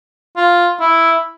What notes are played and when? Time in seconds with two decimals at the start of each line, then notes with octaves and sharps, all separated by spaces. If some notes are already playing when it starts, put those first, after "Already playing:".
0.37 F4
0.80 E4